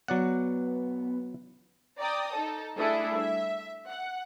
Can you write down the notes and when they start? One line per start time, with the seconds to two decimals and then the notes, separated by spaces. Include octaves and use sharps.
0.08 F#3 B3 D5 F#5
1.99 D5 G5 A#5 D#6
2.34 D#4 A4
2.77 G3 A3 D4 E4 G#4 A4
3.17 E5
3.87 F#5